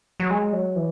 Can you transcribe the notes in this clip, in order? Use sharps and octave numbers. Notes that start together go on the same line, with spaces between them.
F#3
G#3
F#3
E3